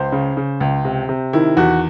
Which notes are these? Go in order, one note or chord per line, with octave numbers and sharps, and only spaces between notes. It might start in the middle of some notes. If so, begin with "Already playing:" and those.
Already playing: C#2 C5
C#3
C#3
C#2
C3
C3
D#3 E4
E2 F#4